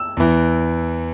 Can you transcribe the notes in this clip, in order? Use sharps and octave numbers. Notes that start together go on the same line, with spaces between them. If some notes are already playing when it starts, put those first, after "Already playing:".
Already playing: E6
E2 E3